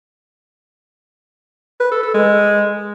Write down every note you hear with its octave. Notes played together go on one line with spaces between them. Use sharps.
B4
A4
A4
G#3